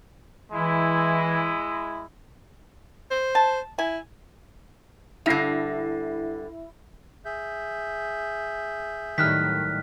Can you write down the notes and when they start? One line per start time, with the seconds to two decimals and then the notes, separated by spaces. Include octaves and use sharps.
0.53 E3 G#3 E4
3.11 C5
3.35 A5
3.78 E4 G#5
5.26 G2 D3 E4 A#6 C7
7.25 G#4 E5 G6
9.18 A2 D#3 F#3 G3 F6 F#6 B6